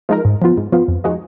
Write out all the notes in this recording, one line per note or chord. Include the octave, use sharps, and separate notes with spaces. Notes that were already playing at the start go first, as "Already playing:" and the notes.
F3 G#3 D#4 A#4
G#2
F3 B3 F4
G#2
F3 B3 F4
F2
F3 G#3 D#4 F#4